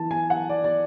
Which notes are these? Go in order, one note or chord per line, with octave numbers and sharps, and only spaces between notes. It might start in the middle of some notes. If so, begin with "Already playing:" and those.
Already playing: E3 A5
G#5
F#5
D5
D5